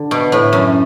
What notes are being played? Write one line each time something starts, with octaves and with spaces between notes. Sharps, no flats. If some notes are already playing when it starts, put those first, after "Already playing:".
Already playing: D3
B2
A2
F#2